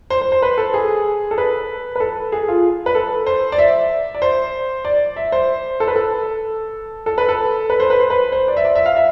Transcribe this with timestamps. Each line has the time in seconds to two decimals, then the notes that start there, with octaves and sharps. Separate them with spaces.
0.10 C5
0.21 C5
0.32 C5
0.42 B4
0.58 A4
0.74 G#4
1.31 A4
1.38 B4
1.96 B4
2.00 A4
2.32 G#4
2.48 F4
2.86 B4
2.95 A4
3.27 C5
3.52 D5
3.58 E5
4.15 D5
4.22 C5
4.85 D5
5.16 E5
5.32 C5
5.80 A4
5.88 B4
5.96 A4
7.06 A4
7.18 B4
7.29 A4
7.70 B4
7.80 C5
7.90 B4
8.00 C5
8.10 B4
8.32 C5
8.48 D5
8.57 E5
8.65 D5
8.75 E5
8.86 F5
8.96 E5